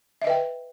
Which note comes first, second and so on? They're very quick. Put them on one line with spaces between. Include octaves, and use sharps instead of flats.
E5 D#5 B4 G5